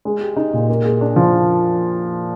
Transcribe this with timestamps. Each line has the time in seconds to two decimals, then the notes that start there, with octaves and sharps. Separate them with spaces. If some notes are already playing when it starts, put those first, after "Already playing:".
0.05 G#3
0.21 G4
0.36 D#4
0.53 A#2
0.69 A#3
0.85 G#4
1.01 D4
1.16 F3